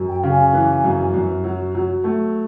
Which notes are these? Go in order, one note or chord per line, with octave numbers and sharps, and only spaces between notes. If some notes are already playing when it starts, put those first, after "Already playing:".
Already playing: F#2
G5
C#3
G#5
E3
F#2
F#2
F#3
F#3
A3